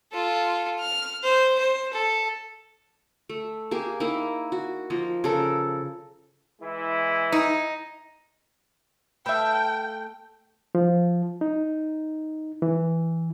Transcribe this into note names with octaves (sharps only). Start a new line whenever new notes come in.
F4 A4
F6
C5
C5
A4
A3
A#3 G4 G#4 G#5
A#3 D#4 E4
F#4
F3 A#3 D#5
C#3 A4 A#4
E3 G#3 E4
D#4
A3 A4 B4 E5 F5 G5
F3
D#4
E3